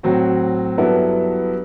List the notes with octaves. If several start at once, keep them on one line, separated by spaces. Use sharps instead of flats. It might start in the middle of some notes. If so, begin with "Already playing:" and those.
A2 F#3 C4 F#4
G2 F#3 B3 E4 A4